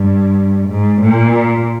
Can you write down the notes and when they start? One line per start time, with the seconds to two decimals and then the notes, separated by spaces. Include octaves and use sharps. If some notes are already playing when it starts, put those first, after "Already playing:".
Already playing: G2
0.69 G#2
1.02 A#2